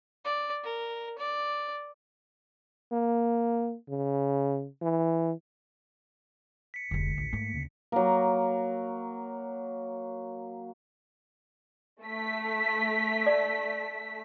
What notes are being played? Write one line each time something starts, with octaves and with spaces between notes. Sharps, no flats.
D5
A#4
D5
A#3
C#3
E3
B6 C#7
F1 D2 D3 G#3
A1
G#2 A3 A#3
D2 C#3
F#3 A#3
A3 B6
D5